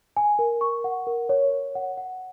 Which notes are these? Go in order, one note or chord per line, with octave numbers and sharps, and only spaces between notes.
G#5
A#4
C#6
F#5
A#4
C#5
C#5
F#5
F#5